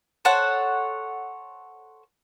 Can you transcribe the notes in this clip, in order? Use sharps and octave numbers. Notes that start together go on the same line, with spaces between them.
A4 C5 C#5 F#5